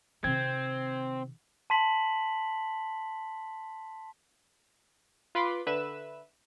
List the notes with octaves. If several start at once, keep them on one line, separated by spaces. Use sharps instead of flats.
C3 D#3 C4 G#6
A5 C6 B6 F#7
F4 B4 B5 C6 D6
D3 B4 E5 E7